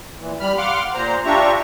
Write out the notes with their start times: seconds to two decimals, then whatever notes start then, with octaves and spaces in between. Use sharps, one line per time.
0.20 A#2 E3
0.40 G3 B5 F6
0.58 F5 F#5 C6 D6 F6
0.95 A#2 C5 A#5
1.26 D4 F4 G4 E5 A#5 C#6